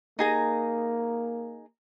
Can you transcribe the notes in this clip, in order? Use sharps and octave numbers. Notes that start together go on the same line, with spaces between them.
A#3 D#4 G#4 A#5